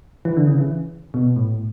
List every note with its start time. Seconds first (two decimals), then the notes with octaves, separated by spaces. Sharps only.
0.25 E3
0.37 D3
0.47 C#3
0.58 E3
1.14 B2
1.36 A2